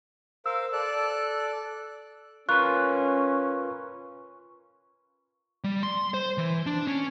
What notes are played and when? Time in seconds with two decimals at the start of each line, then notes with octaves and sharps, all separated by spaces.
0.46 A#4 C5 F5 E6
0.73 A4 D5 F#6
2.49 C#4 F4 A#4 B4 C#6 F#6
5.64 G3
5.83 C6
6.14 C5
6.38 E3
6.66 D4
6.87 C#4